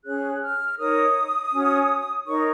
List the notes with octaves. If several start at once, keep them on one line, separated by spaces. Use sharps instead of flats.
C#4 G#4 C#5 F#6
F6
D#4 A#4 C#5 D#6
C#4 F#4 C#5
D#4 A#4 C#5 C#6